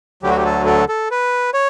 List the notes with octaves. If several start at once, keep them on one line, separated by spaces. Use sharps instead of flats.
D2 D3 F#3 G4
F#4
G4
A4
A4
A4
B4
C#5